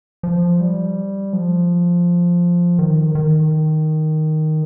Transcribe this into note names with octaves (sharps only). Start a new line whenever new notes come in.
F3
G3
F3
D#3
D#3